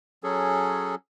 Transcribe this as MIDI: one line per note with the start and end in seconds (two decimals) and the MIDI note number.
0.23 0.95 54
0.23 0.95 61
0.23 0.95 68
0.23 0.95 69